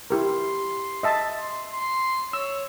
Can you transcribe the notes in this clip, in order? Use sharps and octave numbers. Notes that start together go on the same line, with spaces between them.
E4 G4 A#4 C6
D#5 E5 A5
C6
C6
C#5 E6